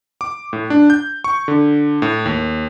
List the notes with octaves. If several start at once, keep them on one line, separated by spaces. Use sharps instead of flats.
D6
A2
D4
G6
C#6
D3
A2
D#2